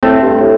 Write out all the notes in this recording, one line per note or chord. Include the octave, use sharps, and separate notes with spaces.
A2 A3 C4
G2
A2